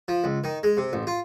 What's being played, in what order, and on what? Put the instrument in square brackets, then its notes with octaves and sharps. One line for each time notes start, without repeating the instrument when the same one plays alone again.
[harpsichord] F3
C#2
D#3
G#3
C3
A1
F4